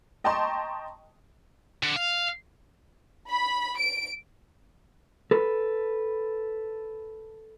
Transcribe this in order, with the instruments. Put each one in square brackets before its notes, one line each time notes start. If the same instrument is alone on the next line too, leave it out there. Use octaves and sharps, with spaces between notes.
[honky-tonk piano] D#5 G5 A5 A#5 C6 C#6
[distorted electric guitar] D3
F5
[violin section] B5
D7
[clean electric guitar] A4 B4